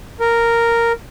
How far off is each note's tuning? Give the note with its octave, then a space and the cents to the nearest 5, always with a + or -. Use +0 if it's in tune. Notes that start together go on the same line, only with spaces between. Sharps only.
A#4 -5